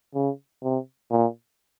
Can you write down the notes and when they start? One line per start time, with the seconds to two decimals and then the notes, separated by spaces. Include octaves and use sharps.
0.15 C#3
0.63 C3
1.11 A#2